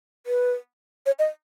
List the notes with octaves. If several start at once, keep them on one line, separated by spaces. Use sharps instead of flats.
B4
C#5
D#5